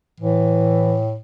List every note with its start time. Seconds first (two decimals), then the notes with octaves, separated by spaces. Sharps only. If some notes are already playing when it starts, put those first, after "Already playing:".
0.20 A2 E3